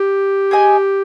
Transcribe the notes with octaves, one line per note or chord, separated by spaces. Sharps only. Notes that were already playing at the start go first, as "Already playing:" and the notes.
Already playing: G4
G#4 D#5 G#5